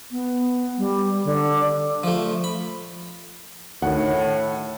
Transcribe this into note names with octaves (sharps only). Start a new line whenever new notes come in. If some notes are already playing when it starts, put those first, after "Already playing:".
B3
G3
D3
F3 A3
B5
D2 A2 D#3 F#5